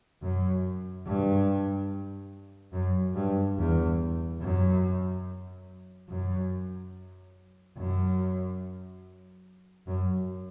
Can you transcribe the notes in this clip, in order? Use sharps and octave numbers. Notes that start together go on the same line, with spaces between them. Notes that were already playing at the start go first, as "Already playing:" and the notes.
F#2
G2
F#2
G2
E2
F#2
F#2
F#2
F#2